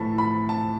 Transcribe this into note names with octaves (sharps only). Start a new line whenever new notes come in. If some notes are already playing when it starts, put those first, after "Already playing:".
Already playing: A2 E3 A3 A5 B5
B5
A5